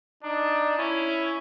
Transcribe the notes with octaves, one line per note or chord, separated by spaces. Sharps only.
D4 D#4
C#4 E4